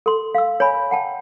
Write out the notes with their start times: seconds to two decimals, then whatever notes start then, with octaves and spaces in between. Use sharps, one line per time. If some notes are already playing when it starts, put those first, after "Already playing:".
0.06 A4 C6
0.35 F5 E6
0.60 C#5 G#5 B5
0.91 F#5 G5 A5